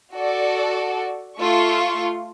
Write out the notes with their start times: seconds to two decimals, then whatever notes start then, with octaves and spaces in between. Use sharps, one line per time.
0.14 F#4 A4 D5
1.39 A3 F4 C#6